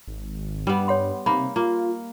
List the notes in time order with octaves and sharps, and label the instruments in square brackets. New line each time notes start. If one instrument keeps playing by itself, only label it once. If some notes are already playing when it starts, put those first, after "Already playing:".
[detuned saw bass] G#1
[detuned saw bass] G2 [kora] G3 B3
[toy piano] C#5 F#5 C6
[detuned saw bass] C3 [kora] A#3 D#4 [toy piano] B5
[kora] A#3 [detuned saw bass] F4